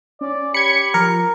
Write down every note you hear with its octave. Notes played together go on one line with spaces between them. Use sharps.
C#4 D5
G4 B5 G#6 C#7
F3 A#4